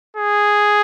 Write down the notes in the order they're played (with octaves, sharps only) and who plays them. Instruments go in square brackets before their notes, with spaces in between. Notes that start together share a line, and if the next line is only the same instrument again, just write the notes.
[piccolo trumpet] G#4